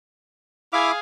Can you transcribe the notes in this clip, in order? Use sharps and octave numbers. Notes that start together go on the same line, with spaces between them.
E4 G#4 E5 F5 D6